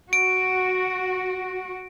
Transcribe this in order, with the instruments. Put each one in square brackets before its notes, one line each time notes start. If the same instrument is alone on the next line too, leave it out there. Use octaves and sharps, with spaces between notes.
[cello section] F#4 [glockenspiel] D7